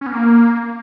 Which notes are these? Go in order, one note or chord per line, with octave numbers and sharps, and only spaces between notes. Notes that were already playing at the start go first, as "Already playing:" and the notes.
C#4
B3
A#3